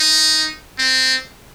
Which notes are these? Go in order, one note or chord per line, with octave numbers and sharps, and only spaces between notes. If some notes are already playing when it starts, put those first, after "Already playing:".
Already playing: D#4
C4